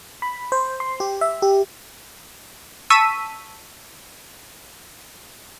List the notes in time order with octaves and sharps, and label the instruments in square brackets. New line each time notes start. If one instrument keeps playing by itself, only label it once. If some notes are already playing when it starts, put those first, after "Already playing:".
[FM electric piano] B5
C5
C6
G4
E5
G4
[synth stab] A5 C#6 E6 B6 D#7